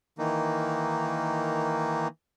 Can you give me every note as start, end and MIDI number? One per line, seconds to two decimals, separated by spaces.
0.18 2.08 51
0.18 2.08 52
0.18 2.08 58
0.18 2.08 63